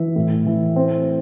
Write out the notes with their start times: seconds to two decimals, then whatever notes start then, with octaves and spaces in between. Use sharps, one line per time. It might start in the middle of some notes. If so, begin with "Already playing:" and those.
Already playing: E3 E5
0.16 A2
0.46 E3
0.76 C4